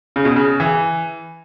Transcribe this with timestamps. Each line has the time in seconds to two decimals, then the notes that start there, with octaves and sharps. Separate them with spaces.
0.16 C#3
0.25 B2
0.36 C#3
0.60 E3